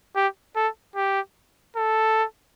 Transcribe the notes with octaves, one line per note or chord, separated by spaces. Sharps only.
G4
A4
G4
A4